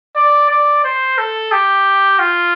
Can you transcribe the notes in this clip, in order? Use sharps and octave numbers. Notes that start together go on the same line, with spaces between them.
D5
D5
C5
A4
G4
F4